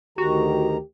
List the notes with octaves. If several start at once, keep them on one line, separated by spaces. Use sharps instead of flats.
D2 D#3 F#4 G4 A#5